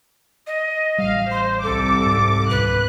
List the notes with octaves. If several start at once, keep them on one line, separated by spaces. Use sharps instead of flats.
D#5
A1 G3 F5
C5 C6
C2 A4 D6
G#2
C#2 G#2 B2 B4 F#6